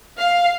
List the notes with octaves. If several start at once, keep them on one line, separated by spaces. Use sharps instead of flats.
F5